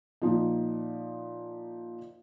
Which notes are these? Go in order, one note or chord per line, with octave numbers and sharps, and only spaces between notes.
A#2 F3 D#4